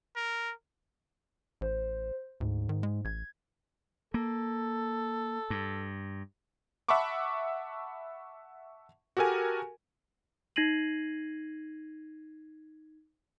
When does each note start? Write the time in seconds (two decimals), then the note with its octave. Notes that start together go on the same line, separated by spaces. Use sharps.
0.16 A#4
1.61 A1 C5
2.40 D2 G#2
2.69 D#3
2.83 G#3
3.05 A1 G#6
4.14 A#3 A4
5.50 G2
6.88 E5 F#5 A5 B5 C#6 D6
9.17 F#4 G4 A4 A#4 G#5
10.56 D#4 G#6 A#6 C7 D#7 F#7